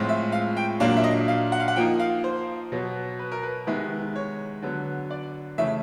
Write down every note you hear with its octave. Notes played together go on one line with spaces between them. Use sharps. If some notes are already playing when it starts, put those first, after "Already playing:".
Already playing: A2 F3 G#3 C4 F4
E5
F5
G5
A#2 F#3 A#3 D4 F5
E5
D#5
F5
F#5
F5
F#5
F3 A#3 D#4 G5
F5
C5
B2 F#3 B3
B4
A#4
B4
C3 D#3 G#3 B3 E4
C#5
D3 F#3 B3
D5
C#3 E3 A3 C#4 E5